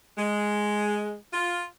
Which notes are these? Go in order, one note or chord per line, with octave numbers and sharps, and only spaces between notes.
G#3
F4